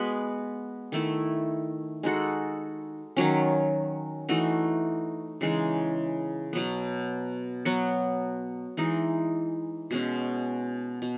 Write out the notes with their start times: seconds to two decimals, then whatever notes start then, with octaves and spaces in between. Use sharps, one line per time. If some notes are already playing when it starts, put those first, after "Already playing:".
Already playing: G#3 B3 F#4 B4
0.92 D#3 A3 E4
2.03 G#3 D#4 F#4 A4
3.17 D#3 F#3 C#4
4.29 E3 A3 D#4 F#4
5.41 C#3 E3 G#3 D#4
6.53 B2 F#3 B3
7.65 F#3 B3 F#4
8.77 E3 G#3 D#4
9.91 B2 G#3 C#4
11.02 B2